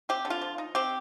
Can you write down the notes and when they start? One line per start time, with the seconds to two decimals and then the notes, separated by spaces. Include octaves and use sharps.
0.09 C4 G4
0.25 D3
0.30 F4
0.41 F3
0.58 D#4
0.75 C4 G4